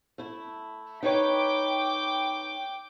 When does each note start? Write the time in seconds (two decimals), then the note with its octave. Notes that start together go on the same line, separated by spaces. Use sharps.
0.18 A3 E4
1.03 D#4 B4 C#5 G5 D6